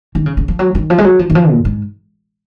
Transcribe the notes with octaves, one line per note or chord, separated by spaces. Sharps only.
D#3
C#3
C#3
F3
F#3
D#3
F3
G#3
F#3
F3
D#3
F3
A#2
G#2